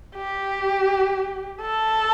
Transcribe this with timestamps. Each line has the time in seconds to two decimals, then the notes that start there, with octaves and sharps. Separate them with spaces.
0.16 G4
1.61 A4